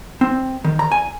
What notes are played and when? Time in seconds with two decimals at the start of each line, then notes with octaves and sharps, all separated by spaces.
0.21 C4
0.64 D#3
0.79 A#5
0.92 G#5